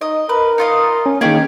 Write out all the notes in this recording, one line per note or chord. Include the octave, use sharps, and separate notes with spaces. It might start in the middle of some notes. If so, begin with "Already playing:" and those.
D#4 D#5
A#4 B4
D#4 F4 D#5
C#4
D#3 A#3 C#4 D#4 G4 G#4